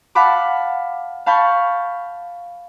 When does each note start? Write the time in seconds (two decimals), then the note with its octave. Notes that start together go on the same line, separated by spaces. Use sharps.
0.15 F5 F#5 A5 B5 D6
1.26 F5 A5 B5 C#6 G6